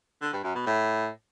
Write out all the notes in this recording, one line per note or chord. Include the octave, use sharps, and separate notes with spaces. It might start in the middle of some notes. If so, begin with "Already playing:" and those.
D3
G2
F#2
B2
A2